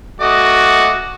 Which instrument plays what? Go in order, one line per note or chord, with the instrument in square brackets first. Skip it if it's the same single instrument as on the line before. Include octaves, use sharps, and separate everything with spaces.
[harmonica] A3 D#5 D6 [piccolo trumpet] F#4